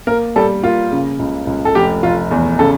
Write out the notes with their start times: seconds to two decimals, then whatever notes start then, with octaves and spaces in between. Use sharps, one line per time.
0.07 A#3 A#4
0.36 G3 A4
0.63 A#3 F4
0.92 C#3
1.19 C#2
1.47 C#2
1.65 A4
1.75 F1 G4
2.03 F1 F4
2.31 E2
2.59 C#3 A4